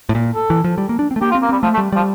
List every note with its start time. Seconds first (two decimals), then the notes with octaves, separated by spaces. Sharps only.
0.09 A2
0.15 A#2
0.35 A4
0.50 E3
0.64 F3
0.78 G3
0.89 A#3
0.99 D4
1.11 C4
1.16 A3
1.21 A#3 G4
1.31 F4
1.35 C4
1.42 A#3
1.49 G3 C4
1.63 F3 A3
1.74 A3
1.78 G3
1.92 F3 G3